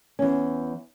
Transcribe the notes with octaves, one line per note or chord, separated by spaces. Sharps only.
E2 C#4